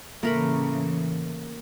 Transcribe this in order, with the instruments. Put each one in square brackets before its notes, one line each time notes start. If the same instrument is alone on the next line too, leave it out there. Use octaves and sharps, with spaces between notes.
[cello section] A2 C#3 E3 [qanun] A3 A#4 B5 [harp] A#3